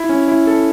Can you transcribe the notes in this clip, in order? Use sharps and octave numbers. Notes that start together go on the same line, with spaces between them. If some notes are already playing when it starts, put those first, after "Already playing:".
Already playing: E4
C#4
E4
A4